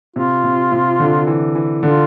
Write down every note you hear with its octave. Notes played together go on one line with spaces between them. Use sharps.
C3 F4
C3
C3
D3
E3
E3
D3 F4